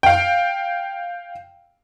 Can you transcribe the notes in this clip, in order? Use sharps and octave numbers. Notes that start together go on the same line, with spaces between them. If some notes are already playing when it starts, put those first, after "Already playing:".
F5 G5